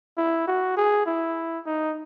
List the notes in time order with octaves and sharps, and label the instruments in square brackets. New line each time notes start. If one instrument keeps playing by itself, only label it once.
[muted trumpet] E4
F#4
G#4
E4
D#4